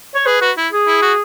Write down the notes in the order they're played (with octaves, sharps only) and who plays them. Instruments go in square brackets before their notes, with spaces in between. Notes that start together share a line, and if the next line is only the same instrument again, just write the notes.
[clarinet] C#5
[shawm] G#4 [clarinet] B4
[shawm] F#4 [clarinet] B4
[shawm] E4
[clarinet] G#4
[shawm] E4
F#4